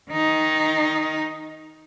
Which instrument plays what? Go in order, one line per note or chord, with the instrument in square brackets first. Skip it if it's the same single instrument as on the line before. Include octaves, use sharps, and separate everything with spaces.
[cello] D#3 D#4